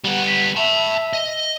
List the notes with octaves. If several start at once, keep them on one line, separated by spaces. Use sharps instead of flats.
G3 B3 F#5
B6
E5 A5 B5
D#5